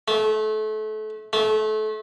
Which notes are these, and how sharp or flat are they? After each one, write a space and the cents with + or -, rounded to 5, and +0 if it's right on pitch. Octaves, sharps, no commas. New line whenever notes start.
A3 -30
A3 -30